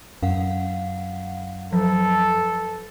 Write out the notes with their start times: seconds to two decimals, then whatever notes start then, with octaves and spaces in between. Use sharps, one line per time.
0.23 F#2 F5 F#5
1.73 F3 F#3 A4